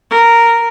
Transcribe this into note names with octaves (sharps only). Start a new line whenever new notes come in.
A#4